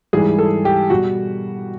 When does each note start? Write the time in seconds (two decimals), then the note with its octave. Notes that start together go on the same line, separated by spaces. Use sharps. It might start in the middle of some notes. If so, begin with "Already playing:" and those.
0.13 G#2 E3 G3 G#4
0.38 A4
0.65 G4
0.90 B2 G3 F#4